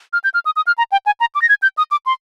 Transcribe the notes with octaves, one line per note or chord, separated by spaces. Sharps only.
F6
G6
F6
D#6
D#6
F6
A#5
G5
G#5
A#5
D6
A#6
G#6
G6
D#6
D6
C6